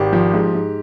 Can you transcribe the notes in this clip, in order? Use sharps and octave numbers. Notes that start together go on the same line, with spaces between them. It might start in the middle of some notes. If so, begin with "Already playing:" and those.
Already playing: G#1 G4
F3
G#2
G#2